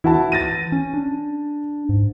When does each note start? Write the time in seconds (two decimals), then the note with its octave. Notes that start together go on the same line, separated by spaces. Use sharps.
0.04 E3 E4 F#4 A5
0.32 A6 A#6 D#7
0.72 C#4
0.94 D4
1.89 G#2